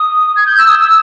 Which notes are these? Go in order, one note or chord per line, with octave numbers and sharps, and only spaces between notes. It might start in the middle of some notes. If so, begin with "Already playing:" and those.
Already playing: D#6
G#6
G6
E6
D#6
E6